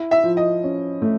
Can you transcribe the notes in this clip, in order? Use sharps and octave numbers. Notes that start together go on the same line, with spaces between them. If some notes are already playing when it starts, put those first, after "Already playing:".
Already playing: E4
E5
F3
D#5
C#4
A3